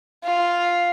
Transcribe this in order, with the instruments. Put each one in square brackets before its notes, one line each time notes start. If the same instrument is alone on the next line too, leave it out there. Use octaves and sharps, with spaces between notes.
[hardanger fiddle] F4